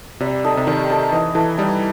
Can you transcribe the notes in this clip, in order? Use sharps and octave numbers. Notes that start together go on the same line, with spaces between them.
C3 G3
D#4 A4
C3
D#3 G3
D#4 A4
E3 D#4
E3 A4 E5
G3 D#4